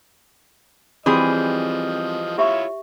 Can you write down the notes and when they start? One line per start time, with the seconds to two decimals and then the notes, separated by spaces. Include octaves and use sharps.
1.06 E3 F3 G3 C4 F#4 G#4 D#5
2.38 E4 F4 G4 C#5 E5 C#6